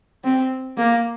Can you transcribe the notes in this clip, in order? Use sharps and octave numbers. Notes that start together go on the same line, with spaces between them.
C4
A#3